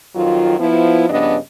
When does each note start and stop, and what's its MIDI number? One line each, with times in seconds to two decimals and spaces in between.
0.15 0.54 41
0.15 0.54 51
0.15 0.54 54
0.15 0.54 65
0.59 1.05 53
0.59 1.05 59
0.59 1.05 64
1.09 1.36 43
1.09 1.36 49
1.09 1.36 53
1.09 1.36 59
1.09 1.36 62
1.09 1.36 75